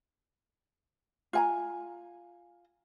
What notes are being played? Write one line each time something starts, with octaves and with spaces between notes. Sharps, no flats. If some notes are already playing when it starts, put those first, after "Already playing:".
F4 G#5 A#5